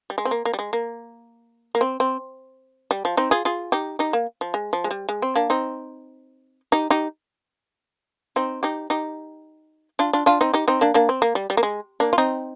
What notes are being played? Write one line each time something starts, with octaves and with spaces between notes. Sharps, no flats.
G3
G#3
C4
A#3
A#3
G3
G#3
A#3
A#3
C4
C4
G3
F3
C4 D#4
F4 G#4
F4 G#4
D#4 G4
D#4 G4
A#3
F3
G#3
F3
G#3
G3
G#3
C4
A#3 D4
C4 D#4
D#4 G4
D#4 G4
C4 D#4
D#4 G4
D#4 G4
D4 F4
D4 F4
D4 F4
C4 D#4
D#4 G4
C4 D#4
A#3 D4
A#3 D4
C4
A#3
G3
G3
A#3
G#3
A#3 D4
F4
C4 D#4